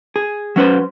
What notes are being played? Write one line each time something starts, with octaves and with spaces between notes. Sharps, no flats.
G#4
F#3 C#4 B4 C5